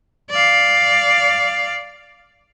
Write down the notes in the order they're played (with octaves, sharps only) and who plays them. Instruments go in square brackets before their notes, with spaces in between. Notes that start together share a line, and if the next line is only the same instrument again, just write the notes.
[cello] D5 F5